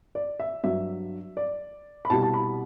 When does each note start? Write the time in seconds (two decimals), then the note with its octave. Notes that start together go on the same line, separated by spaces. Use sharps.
0.15 D5
0.39 E5
0.63 G2 F#3 E5
1.37 D5
2.05 B5
2.10 C2 B2 G3 A5
2.23 A5
2.34 B5